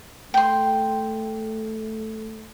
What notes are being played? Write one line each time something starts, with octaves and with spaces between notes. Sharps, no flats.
A3 G5 C6